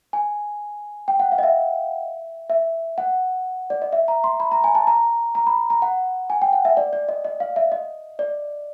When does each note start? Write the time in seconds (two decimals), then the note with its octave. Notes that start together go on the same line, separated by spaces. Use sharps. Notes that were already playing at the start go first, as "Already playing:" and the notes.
0.13 G#5
1.08 G5
1.19 F#5
1.32 F5
1.38 D#5
1.43 E5
2.50 E5
2.98 F#5
3.70 D5
3.82 D#5
3.93 E5
4.08 A#5
4.24 C6
4.40 B5
4.52 A#5
4.64 G#5
4.75 A5
4.87 A#5
5.35 A#5
5.47 B5
5.70 A#5
5.82 F#5
6.30 G#5
6.42 G5
6.53 F#5
6.65 E5
6.77 D5
6.93 D5
7.09 D#5
7.25 D#5
7.40 F5
7.56 E5
7.72 D#5
8.19 D5